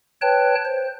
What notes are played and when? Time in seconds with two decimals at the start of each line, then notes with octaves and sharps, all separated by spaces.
0.22 B4 C#5 G5 A5 F#6
0.65 C5